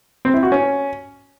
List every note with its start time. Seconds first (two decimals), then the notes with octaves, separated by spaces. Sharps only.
0.25 C4
0.34 E4
0.43 F#4
0.52 C#4